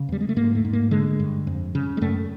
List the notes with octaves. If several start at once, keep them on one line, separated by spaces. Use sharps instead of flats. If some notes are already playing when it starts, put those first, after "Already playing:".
Already playing: C#3
E2 G3
G#3
A3
G#2 A#3
A3
G#2
A#3
D3 G#3
G2
F2
C#3
G#3
F#2 A3